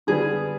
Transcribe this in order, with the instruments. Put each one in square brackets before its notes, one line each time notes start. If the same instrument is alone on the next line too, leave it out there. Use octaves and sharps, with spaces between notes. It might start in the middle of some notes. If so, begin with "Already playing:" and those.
[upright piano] D3 G3 B3 [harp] G#4